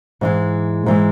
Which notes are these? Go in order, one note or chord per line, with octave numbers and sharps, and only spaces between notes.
G#2 E3 G#3
G#2 E3 G#3